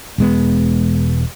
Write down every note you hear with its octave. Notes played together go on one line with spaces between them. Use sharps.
E1 G#3 B3